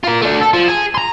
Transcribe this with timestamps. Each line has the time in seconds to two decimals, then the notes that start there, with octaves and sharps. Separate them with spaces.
0.04 F4 A#4
0.22 A3 D4
0.41 A4
0.54 F3
0.68 G#4
0.95 A#5 C6